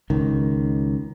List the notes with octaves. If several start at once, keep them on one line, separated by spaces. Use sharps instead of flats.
C#2 D#3